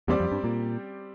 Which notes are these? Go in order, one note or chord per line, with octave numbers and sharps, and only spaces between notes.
E2 G3 C4 G4 D5
F2
G2
A#2